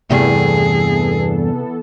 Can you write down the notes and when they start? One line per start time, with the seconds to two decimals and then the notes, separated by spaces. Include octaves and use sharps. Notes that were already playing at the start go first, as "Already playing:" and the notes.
0.11 E2 G2 C3 E3 A3 B3 G#4 A4